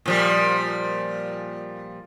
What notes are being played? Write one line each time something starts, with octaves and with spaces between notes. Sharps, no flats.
A#2 F3 G3